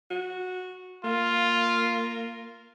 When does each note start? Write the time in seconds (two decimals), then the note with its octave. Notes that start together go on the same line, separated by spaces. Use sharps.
0.11 F#4
1.04 A#3 F4